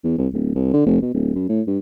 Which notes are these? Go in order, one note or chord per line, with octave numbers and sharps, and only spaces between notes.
E2
C2
D1
C2
D3
F1
B2
D1
F#2
A2
G2